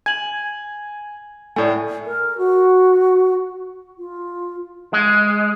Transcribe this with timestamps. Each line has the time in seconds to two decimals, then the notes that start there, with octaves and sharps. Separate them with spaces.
0.06 G#5 G#6 F#7
1.56 A2 A3 D5 G#5
2.06 A#4
2.38 F#4
3.98 F4
4.93 G#3